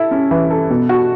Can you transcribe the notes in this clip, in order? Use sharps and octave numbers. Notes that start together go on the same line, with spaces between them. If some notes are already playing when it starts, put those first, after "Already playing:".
Already playing: E4 A4
C#4
E3
A4
B2
F#4